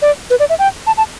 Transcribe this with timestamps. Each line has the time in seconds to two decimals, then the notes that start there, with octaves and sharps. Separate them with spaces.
0.02 D5
0.30 B4
0.40 D5
0.49 E5
0.59 G5
0.87 A5
0.97 A5